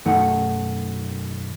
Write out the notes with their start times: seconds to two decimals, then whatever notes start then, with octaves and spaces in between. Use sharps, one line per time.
0.05 B1 F#2 D#3 A3 D#4 F#5